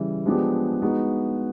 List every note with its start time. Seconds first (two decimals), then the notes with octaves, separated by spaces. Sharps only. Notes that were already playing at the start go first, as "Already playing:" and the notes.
Already playing: C#3 E3 G3
0.26 F3 G#3 B3 D4 G4
0.82 G#3 B3 D#4 F#4